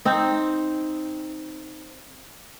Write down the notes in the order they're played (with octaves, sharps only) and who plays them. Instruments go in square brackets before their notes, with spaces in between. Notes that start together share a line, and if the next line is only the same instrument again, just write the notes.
[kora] C4 D#4